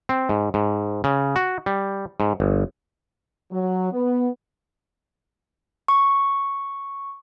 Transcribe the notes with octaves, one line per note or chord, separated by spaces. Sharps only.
C4
G#2
G#2
C#3
F#4
G3
G#2
G1
F#3
B3
C#6